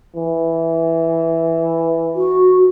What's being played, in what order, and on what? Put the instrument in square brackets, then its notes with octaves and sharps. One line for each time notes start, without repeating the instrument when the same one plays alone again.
[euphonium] E3
[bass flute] F#4